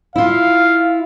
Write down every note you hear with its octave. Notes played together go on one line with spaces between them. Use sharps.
E4 F4 F5